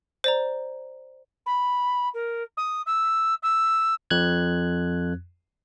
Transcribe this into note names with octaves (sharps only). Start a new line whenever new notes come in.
C5 D5 A#5
B5
A#4
D#6
E6
E6
F2 F#6 G#6